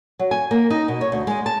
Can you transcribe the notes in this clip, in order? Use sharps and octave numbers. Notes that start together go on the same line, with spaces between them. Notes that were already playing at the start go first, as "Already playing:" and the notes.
F#3
G#5
A#3
D#4
B2
C#5
D2
G#3
A5